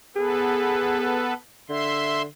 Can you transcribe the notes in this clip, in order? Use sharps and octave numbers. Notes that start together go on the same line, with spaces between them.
B3 G#4 A4 B4
D3 E5 C6